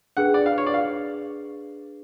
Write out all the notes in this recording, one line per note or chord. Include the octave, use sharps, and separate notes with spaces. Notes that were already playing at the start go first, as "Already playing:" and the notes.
D4 G#4 B4 F#5
D5
F5
C#5
D5
F5